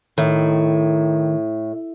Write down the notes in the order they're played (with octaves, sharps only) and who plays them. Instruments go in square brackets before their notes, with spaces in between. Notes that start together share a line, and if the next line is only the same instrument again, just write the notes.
[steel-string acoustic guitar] A2 [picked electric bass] D#3